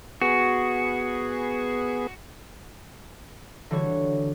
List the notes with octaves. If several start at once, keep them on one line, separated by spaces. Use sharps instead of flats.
B3 F#4 G#4
D3 E3 G3 F#4 C#5